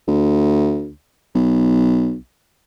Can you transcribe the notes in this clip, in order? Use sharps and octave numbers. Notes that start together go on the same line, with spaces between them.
D2
B1